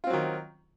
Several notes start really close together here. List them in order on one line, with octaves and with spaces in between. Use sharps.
F4 C4 F#3 D#3